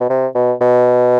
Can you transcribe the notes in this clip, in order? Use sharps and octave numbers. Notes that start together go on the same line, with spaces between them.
B2
C3
B2
B2